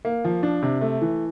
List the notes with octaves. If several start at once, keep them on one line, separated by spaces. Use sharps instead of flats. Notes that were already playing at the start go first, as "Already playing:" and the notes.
A#3
F3
D4
C3
A3
E3